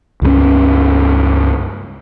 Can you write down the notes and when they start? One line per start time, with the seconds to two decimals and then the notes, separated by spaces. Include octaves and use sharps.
0.22 C#2 G2 G3 C#4